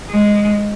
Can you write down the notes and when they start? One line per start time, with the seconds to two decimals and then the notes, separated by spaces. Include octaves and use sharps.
0.10 G#3